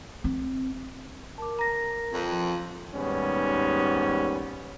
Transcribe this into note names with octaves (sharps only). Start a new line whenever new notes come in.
C4
A#4 A5 D6
A#5 A#6
F2
F3
D#2 G#2 G3 B3 C#4